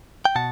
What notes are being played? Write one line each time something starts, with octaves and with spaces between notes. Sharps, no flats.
G5
B2 F#5 A5